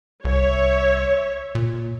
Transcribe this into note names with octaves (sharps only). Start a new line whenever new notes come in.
C2 C#5 E5
A#2